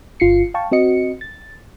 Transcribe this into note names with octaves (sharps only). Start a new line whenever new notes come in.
G1 F4 C7 C#7
F5 G5 A5 C#6
C4 F#4 D#5 C#7
A6